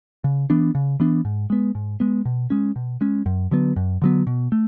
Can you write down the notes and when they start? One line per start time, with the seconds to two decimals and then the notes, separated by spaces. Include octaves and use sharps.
0.24 C#3
0.50 E3 B3 D4
0.75 C#3
1.00 E3 B3 D4
1.25 G#2
1.50 G#3 B3
1.75 G#2
2.00 G#3 B3
2.25 B2
2.50 G#3 C#4
2.76 B2
3.01 G#3 C#4
3.26 F#2
3.51 D3 F#3 B3
3.76 F#2
4.02 D3 F#3 B3
4.27 B2
4.52 A3